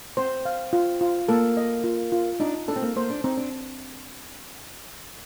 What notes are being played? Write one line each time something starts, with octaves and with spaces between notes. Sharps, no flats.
C4 C5
F5
F4
F4
A#3 A4
D#5
F4
F4
D4 D#4
D4 A4
C4
A#3
A#3 C5
D4
C4 D#4
D4